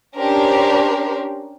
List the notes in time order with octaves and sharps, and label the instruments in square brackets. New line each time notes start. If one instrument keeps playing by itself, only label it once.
[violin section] C#4 D4 G4 A#4 C5